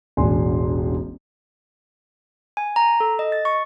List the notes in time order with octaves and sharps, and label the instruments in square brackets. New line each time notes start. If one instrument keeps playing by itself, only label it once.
[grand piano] E1 A1 D4 G#5 C6
[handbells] G#5
A#5
A4
D#5
A6
C#6